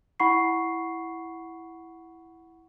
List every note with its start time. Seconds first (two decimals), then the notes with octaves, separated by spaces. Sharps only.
0.20 E4 F#5 B5 C#6 C7